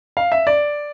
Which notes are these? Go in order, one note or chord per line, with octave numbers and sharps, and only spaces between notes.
F5
E5
D5